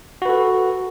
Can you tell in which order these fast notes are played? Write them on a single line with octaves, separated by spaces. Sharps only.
F#4 B4 A4